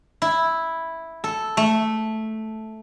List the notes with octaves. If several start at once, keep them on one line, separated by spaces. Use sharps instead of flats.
E4
A4
A3